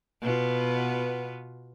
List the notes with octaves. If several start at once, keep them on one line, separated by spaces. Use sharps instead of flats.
B2 B3 F4